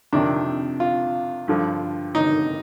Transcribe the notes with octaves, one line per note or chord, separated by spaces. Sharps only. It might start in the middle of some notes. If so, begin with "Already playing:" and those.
F2 C3 D#3 D4
F4
G2 D3 F3
D#4